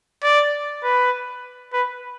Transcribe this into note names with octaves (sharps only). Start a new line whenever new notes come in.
D5
B4
B4